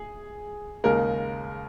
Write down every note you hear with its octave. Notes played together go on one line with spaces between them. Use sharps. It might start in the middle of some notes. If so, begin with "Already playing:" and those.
Already playing: G#4
D#2 C#3 G#3 A#4